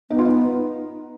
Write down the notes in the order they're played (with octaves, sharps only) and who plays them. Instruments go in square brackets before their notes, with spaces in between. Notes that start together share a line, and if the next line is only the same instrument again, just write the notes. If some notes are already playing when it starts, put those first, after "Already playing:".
[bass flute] B3 [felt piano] D#4
[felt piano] F4
D#4